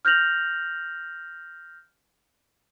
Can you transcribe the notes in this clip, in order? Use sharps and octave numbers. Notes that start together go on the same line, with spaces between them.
F6 G6 A#6 F7 F#7